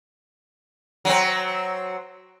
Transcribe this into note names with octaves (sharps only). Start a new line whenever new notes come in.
F#3 C4